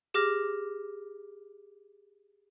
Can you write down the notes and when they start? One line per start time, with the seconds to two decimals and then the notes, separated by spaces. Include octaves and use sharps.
0.14 G4 G#4 D6 F6 A#6